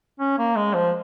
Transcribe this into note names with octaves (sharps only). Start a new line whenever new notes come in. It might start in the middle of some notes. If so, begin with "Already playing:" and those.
C#4
A#3
G#3
F3